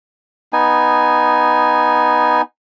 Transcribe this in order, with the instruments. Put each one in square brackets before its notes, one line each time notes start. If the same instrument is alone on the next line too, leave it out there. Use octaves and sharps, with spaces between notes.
[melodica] B3 D#4 G#5